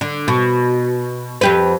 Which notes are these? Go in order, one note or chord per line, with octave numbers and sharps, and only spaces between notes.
D3
B2
F2 G4 B4